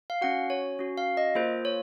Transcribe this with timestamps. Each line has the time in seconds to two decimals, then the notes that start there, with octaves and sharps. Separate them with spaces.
0.10 F5
0.21 C#4 F#4 F#5
0.50 C#5
0.79 C#4 F#4
0.98 F5
1.17 D#5
1.35 A#3 F4 G#4 C5
1.65 C#5